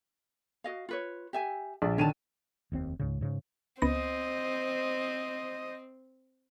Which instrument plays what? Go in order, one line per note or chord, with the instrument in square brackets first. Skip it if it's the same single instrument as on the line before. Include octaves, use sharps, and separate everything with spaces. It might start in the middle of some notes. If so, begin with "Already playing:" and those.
[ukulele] F#4 D#5 F5
F4 B4 C#5
G4 E5 G#5
[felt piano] A#1 [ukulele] D5
[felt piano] D3 D#3 D#7 [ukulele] C#5 A5
[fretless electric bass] F1 D#2 C4
C#2 G#2 C#3
G#2 C#3
[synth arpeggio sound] C#2 B3 A#6 [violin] C4 [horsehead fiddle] C5 D#5